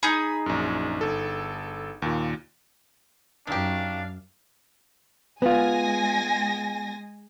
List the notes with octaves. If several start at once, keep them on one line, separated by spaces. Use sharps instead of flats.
D#4 G#4 B5 G#6
A#1 F#2
G1 A4
D#2 A#2
F#2 D4 D#4 G4 F5
G#3 B3 F4 G#5 A#6